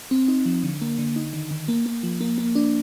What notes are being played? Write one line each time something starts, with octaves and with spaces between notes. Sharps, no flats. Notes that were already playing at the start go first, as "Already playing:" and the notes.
C4
D#4
F3
D3
A#3
D3
D#4
D#3
D#3
A#3
A#3
F3
A#3
A#3
D4